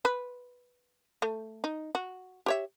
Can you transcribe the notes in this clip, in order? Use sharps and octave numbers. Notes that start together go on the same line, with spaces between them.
B4
A3
D#4
F#4
G4 C#5 E5